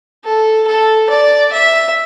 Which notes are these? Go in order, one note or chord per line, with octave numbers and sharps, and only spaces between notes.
A4
A4
D5
E5